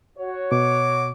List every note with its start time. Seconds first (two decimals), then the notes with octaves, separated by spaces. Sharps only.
0.18 F#4 C#5
0.52 B2 D6